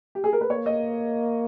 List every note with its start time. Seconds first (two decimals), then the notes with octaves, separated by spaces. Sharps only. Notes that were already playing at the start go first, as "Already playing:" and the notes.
0.15 G4
0.24 G#4
0.33 A#4
0.41 B4
0.50 A#3 C#5
0.66 D#5